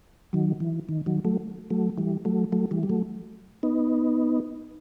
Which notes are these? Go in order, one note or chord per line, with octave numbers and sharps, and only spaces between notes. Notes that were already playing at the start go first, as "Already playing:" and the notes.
D#3 F#3
E3
D#3
D#3 F#3
F#3 A3
F#3 A3
E3 G3
F#3 A3
F#3 A3
E3 G3
G3
F#3 A3
B3 D#4